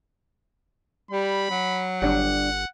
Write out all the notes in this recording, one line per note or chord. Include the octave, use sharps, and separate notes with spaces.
G3 B5
F#3
G1 G3 D4 F#5